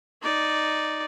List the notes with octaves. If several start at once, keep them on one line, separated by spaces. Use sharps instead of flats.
D#4 D5